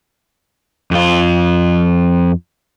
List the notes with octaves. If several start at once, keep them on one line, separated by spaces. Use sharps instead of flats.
F2 F4